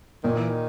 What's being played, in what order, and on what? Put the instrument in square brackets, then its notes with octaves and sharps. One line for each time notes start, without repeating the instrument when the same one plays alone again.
[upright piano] A#2 [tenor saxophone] D#3
[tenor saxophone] E3
D#3